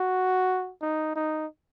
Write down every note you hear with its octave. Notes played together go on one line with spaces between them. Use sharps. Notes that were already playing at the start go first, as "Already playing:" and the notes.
Already playing: F#4
D#4
D#4